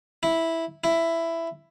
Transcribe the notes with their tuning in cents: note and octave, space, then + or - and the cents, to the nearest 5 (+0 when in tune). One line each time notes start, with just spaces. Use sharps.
E4 -5
E4 +10